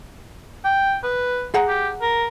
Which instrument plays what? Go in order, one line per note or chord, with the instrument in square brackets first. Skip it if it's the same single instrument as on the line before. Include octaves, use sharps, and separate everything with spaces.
[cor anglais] G5
B4
[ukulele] G#4 F#5 A#5
[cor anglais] G4
A#4